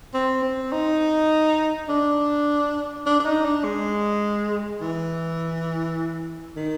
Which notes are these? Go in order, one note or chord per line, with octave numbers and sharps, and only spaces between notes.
C4
C4
D#4
D4
D4
D4
D#4
D4
G#3
E3
D#3